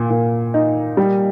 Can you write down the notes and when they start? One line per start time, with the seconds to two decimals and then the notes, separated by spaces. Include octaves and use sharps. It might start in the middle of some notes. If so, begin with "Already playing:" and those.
Already playing: A#2
0.10 A#2
0.54 D#4
0.97 G3